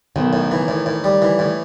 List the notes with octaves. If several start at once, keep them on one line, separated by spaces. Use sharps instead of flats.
B1 D#3
A2
E3
A2
A2
G3
E3
A2